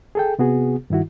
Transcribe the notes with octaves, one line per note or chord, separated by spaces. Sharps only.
G#4 A4 G5
C3 B3 F#4 G#4
G2 D#3 E4 F#4